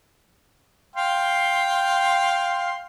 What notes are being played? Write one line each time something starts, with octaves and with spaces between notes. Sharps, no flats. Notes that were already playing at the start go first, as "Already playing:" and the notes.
F5 G5 C6